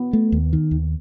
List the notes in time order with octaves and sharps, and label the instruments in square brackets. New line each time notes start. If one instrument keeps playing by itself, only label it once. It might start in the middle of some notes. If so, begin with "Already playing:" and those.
Already playing: [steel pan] B3
[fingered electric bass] A3
D#2
D#3
D#2